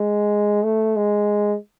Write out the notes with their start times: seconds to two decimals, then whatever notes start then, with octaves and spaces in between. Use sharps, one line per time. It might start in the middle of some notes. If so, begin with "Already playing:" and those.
Already playing: G#3
0.63 A3
0.96 G#3